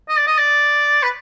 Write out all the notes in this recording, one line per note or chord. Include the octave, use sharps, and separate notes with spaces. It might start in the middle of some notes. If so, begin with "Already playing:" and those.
D#5
D5
D#5
D5
B4